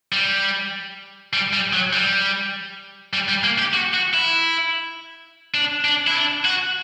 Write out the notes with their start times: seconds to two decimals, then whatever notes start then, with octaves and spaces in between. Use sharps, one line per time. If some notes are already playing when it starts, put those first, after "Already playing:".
0.13 G3
1.33 G3
1.53 G3
1.73 F#3
1.93 G3
3.14 G3
3.29 G3
3.44 A#3
3.59 G4
3.74 F#4
3.94 F#4
4.14 E4
5.54 D4
5.85 D4
6.07 E4
6.15 D4
6.45 F#4